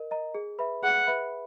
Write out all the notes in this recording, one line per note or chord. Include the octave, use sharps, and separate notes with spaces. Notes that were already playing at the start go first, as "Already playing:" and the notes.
Already playing: A#4 D#5
D#5 A#5
G#4
B4 E5 B5
G#4 F#5
B4 E5 B5